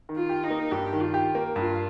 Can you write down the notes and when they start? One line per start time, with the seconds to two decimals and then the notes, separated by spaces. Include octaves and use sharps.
0.09 D#3
0.16 F4
0.29 G4
0.44 D#4
0.50 A#3
0.71 G2 G4
0.93 D#3
1.00 F4
1.14 G4
1.35 A#3
1.56 G2 F4